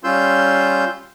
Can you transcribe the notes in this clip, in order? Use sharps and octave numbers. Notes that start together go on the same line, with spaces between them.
G3 C#4 F4 C6 E6 G6